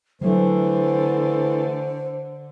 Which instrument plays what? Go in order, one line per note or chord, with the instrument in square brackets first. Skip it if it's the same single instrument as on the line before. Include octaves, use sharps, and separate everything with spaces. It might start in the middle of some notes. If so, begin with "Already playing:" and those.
[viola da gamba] D3 [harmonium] E3 A3 [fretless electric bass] F#3 [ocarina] C5